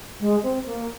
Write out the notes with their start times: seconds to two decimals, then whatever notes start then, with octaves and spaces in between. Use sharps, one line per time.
0.20 G#3
0.43 C4
0.66 A#3